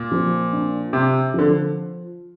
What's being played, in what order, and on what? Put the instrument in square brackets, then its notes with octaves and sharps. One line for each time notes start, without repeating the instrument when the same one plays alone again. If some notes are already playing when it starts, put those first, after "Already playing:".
Already playing: [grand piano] A#2
[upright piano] F3
D4
[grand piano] C3 [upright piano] C4
[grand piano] D3 [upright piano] F3